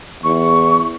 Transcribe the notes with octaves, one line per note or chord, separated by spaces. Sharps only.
E2 C#6